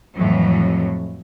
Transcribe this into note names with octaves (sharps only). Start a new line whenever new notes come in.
F2 A2 E3 F#3